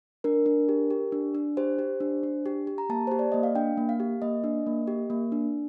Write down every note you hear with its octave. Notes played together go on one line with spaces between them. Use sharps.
D4 A#4
D4
G4
G4
D4
D4
G4 C5
G4
D4
D4
G4
G4
A#5
A#3 A5
G4 C5
D5
A#3 D#5
F5
D4 G5
A#3
F5
G4
A#3 D#5
D4
A#3
G4
A#3
D4